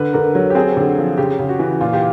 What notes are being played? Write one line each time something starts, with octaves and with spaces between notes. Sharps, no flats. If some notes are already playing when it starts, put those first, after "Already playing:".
Already playing: D3 B4
D3 A#4
F#3
G4
C4 G#4
D3
F3
C#3 G4
C#3
F#4
E3
A#2 F4
G4